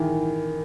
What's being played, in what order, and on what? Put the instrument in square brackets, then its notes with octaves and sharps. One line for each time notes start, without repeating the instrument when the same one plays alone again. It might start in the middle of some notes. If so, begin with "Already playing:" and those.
Already playing: [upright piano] D#3 E3